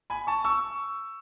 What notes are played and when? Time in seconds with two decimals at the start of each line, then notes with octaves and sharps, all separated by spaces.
0.10 G#5 B5
0.27 A5 C#6
0.44 C#6 E6